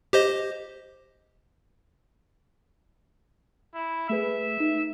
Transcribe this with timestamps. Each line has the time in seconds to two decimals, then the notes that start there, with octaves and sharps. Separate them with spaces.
0.13 G4 C5 D#5
3.75 E4
4.09 A3 G#4 B4 E5
4.58 A3 D#4